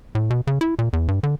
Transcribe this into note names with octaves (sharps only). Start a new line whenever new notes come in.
A2
B2
C#3
E4
A#2
E2
G2
D3